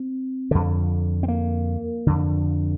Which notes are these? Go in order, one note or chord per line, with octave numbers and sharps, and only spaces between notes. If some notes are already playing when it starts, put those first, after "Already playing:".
Already playing: C4
F2 D3
C4
A#3
F2 D3